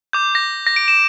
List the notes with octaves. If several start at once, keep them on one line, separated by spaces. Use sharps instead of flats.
D6 G6
A#6
A#6
D7
E7